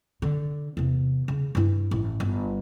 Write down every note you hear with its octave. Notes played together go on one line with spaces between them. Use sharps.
D3
E2 C3
C#3
G2 E4
A1
G1